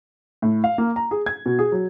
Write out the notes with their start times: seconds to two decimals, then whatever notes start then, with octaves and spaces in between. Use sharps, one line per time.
0.42 A2
0.64 F5
0.78 A#3
0.96 A#5
1.11 G#4
1.26 G#6
1.46 B2
1.59 G#4
1.72 F#3